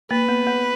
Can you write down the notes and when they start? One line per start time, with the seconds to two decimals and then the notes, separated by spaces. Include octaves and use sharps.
0.11 A#3 B4
0.29 B3
0.47 B3